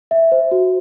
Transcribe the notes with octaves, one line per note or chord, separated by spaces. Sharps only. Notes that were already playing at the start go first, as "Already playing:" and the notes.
E5
C5
F#4